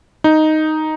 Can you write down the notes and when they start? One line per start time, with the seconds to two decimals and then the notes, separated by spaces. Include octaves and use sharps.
0.24 D#4